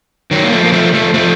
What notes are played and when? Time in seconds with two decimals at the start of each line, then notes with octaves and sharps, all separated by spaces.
0.31 D#3 F#3
0.44 A#3
0.52 F3 A3
0.64 A#3
0.72 F3 A3
0.93 F3 A3
1.14 F3 A3